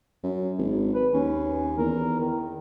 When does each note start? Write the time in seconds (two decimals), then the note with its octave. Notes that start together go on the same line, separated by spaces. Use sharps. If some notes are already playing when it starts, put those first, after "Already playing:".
0.23 F#2
0.58 G#1
0.95 B4
1.14 D#2 C#4
1.78 E2 A#4
2.20 D#3